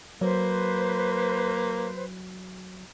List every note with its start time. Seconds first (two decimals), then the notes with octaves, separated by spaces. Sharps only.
0.21 F#3 A#3 B4 C5